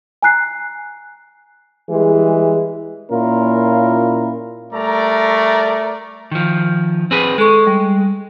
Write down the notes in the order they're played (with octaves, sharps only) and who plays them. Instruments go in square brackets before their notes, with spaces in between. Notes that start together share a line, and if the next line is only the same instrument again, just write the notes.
[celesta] G#5 A#5 F#6 C7
[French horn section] E3 G3 G#3 G4 G#4
[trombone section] A#2 A#3 C#4 E4 F4 A#4
[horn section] G3 G#5 A#5 [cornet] A3 [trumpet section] A#4 D5
[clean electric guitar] D#3 F3
C4 G#4 B4
[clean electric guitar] G#3 [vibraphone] A4 C#6
[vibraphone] G3